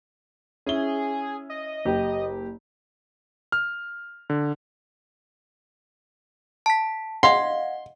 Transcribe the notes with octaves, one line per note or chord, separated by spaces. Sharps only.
C#4 E4 G#4 G7
D#5
F#1 G4
F6
D3
A5 B6
D#5 F5 F#5 C6